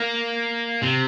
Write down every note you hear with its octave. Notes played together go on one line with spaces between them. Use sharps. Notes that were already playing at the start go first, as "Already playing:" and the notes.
Already playing: A#3
C3